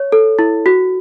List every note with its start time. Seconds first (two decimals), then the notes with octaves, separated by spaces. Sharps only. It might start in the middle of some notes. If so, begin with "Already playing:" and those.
Already playing: C#5
0.12 A4
0.39 E4
0.66 F#4